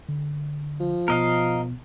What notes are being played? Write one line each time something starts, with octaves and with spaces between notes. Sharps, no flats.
D3
F3
B2 B3 A#4 D#5 F5